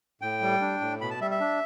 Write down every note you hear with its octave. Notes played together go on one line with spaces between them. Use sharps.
A2 G5
G3
D4
A2
B2 B5
A5
G3 E5
E5
D4